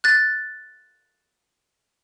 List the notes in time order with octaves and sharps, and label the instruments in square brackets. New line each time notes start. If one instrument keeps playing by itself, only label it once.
[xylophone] F#6 A6